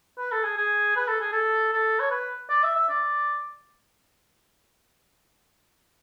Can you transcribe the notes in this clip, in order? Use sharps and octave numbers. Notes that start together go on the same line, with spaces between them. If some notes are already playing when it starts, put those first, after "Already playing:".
B4
A4
G#4
G#4
B4
A4
G#4
A4
A4
C#5
B4
D5
E5
E5
D5